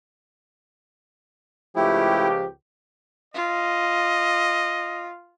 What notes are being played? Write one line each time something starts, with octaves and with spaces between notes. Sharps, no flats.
C#2 F3 A3 E4 G4
F4 D#5